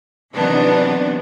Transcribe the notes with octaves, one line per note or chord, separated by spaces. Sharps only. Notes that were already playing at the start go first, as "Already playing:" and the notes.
C3 D#3 E3 F#3 B3 D4